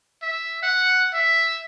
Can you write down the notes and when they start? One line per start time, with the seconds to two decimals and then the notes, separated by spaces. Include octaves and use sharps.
0.23 E5
0.63 F#5
1.14 E5